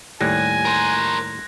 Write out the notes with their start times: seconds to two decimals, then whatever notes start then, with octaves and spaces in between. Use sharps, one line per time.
0.21 D#2 A2 G3 G#5 F#6 G#6 A#6
0.65 A#4 C5 A#6